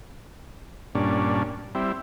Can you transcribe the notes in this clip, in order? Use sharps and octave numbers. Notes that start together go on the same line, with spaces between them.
G2 A#2 C#4 D4
G3 C4 E4